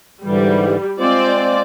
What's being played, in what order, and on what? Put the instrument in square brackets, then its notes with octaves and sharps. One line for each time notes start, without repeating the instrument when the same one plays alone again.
[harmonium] G#2 D3 E3 [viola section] G3
[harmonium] G#3 F4 C5 [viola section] C4 D5